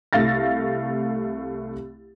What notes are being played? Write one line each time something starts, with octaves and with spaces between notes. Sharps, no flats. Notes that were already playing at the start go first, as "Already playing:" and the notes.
C2 A3 F5 A6 A#6